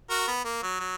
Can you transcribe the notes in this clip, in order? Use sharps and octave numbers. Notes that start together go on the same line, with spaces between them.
F#4 A#4
B3
A#3
F#3
F#3